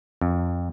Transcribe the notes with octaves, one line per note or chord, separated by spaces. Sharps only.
F2